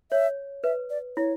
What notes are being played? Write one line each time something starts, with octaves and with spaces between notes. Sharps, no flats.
C#5 E5
B4 E5
D5
E4 C#5